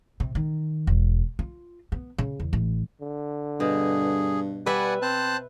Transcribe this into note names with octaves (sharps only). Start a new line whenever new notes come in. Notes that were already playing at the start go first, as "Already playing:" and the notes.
C3
D#3
E1
F4
B3
C#3
E2
A1
D3
G2 B2 G#4
G3 B4 D5 E5 F#5 G#5
C4 C5 A5 F#6